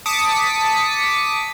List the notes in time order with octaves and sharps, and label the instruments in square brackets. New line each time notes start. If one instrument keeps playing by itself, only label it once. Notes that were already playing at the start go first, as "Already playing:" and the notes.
[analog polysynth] A5 D6 D#6 B6 C#7